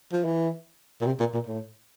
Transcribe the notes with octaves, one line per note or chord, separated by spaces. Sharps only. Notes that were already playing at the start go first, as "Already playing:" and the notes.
F3
E3
A#2
C3
A#2
A#2
A2